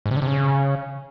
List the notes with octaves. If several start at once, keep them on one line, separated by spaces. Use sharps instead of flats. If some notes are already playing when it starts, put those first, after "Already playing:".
G#2
C3
D3
C3
C#3